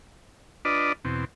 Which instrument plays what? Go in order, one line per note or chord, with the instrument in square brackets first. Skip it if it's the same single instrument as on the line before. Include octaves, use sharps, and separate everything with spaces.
[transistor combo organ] D4 F4 B4 D5 D#5
E2 B2 C4